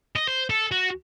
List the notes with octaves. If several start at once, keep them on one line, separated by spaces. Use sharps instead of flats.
D#5
C5
A4
F#4